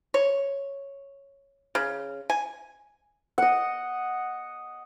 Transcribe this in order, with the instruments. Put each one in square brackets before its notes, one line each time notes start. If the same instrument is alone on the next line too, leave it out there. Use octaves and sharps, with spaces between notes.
[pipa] C#5
C#3
G#5
[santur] D#5 F#5